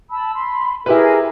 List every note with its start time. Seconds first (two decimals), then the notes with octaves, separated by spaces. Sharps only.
0.11 A5 B5 E6
0.35 B5 C6
0.86 E4 G4 G#4 A#4 B4